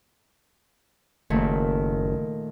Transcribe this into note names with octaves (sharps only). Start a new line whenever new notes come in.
F#1 A#2 D#3 A3